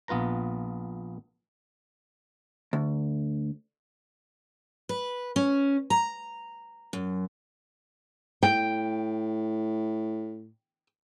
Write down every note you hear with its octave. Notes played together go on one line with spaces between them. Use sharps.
A#1 B3 F4 B4 A#5
D2
B4
C#4
A#5
F#2
A2 G5